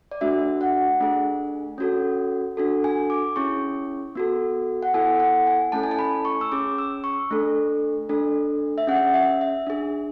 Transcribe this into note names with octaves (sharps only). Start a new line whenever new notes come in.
D5
A3 D4 F#4 E5
F#5
A3 D4 G#4
C#4 F#4 A4
D4 F#4 A4
G#5
D6
C#4 E4 G#4 C#6
B3 F#4 A4
F#5
B3 E4 A4 G#5
F#5
G#5
A3 C#4 E4 A4 A5
G#5
A5
B5
C#6
E6
C#4 G#4 D6
E6
C#6
A3 D4 A4
A3 D4 A4
E5
C#4 G#4 F#5
E5
E5
D4 G#4